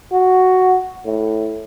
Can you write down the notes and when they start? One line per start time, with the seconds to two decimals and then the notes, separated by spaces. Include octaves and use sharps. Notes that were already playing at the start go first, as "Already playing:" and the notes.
0.12 F#4
1.05 A2